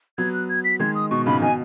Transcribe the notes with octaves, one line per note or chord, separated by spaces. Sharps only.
F#3 B3 G#6
F#6
G#6
B6
D#3 G#3 G#6
D#6
B2 C#6
G#2 C#3 B5
B2 D#3 G#5